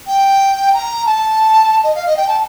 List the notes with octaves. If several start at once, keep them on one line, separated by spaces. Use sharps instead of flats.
G5
A#5
A5
D#5
F5
D#5
G5
A5